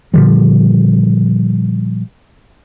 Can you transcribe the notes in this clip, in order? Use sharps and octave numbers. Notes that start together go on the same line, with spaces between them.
A#2 D3 F3 G3